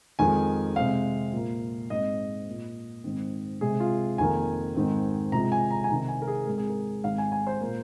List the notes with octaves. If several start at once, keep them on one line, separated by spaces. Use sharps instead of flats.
F2 D#3 G#3 G#5
C3 G#3 C4 F5
A#2 A#3
G#2 G#3 C4 D#5
A#2 A#3
G#2 D#3 C4
C3 G#3 C4 G#4
F4
F2 D#3 A#3 G#5
G#2 D#3 C4
C3 F3 G#3 A#5
G#5
A#5
G#5
C3 D#3 C4 A#5
G#5
A#4
G#4
G#2 G#3 C4 A#4
G#4
A#4
G#2 D#3 G#3 C4 F5
G#5
G#5
C5
A#2 A#3